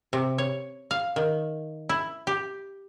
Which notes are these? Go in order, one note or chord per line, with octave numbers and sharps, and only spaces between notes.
C3
C#5
F5
D#3
E4
G4